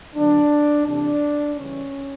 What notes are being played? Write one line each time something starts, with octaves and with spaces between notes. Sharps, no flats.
D3 F#3 B3 D4
C3 E3 A3 D4
C#3 E3 G3 C#4